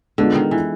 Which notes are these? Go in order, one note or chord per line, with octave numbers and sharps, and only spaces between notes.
D3 G#3 B3 D4 F4
D#3
E3